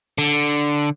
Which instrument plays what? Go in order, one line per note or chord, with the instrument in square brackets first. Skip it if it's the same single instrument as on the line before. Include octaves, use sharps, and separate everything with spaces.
[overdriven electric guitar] D3